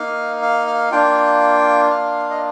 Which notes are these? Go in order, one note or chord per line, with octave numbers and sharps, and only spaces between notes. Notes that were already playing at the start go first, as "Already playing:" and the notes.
Already playing: A#3 D#4 F5
F5
F5
A#3 D4 F4 G5
F5
D#5